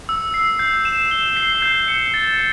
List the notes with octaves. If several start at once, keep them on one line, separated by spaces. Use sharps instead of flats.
E6
C7
G6
E7
G7
C7
G6
C#7
A6